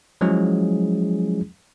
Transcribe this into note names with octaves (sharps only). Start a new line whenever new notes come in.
F3 F#3 G#3 C#4 E4 G#4